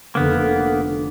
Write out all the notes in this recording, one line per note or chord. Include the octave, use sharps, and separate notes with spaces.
F1 D3 A#3 B3